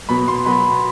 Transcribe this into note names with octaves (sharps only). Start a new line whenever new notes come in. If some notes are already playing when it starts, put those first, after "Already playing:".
B2 F#3 B3 B5
C6
B2 F#3 B3 B5